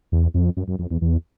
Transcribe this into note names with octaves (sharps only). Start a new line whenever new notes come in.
E2
F2
F#2
F#2
F2
E2
E2